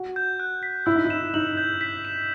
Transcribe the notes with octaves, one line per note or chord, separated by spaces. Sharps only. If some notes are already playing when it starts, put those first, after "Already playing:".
Already playing: F#4
G6
F#6
B6
E4 E6
D#4
E4
E7
D#4 F#7
G6
B6
E7